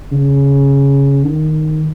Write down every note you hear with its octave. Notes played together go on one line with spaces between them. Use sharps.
C#3
D#3